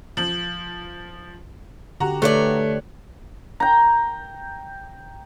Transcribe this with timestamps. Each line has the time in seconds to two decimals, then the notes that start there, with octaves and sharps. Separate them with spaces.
0.17 F3
2.00 D3 F#4 G4 A#5
2.22 D3 A3 B4 C#5 D5
3.60 G5 A#5